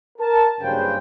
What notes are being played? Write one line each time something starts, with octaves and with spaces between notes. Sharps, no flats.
A#4 A5
F#1 G2 C#3 B4 C5 G5